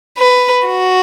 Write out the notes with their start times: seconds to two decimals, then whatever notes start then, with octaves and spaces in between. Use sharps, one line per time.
0.18 B4
0.67 F#4